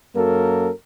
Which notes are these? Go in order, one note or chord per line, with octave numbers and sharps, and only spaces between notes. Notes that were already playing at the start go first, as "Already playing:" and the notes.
F#2 F#3 A#3 A4 A#4